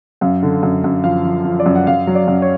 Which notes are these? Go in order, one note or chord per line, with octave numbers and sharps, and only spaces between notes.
F#2 F5
D3
F#2
F#2
F3 F5
F3
F3
D5
F#2
F#5
F#2 F5
F#3
D5
F#2
C#5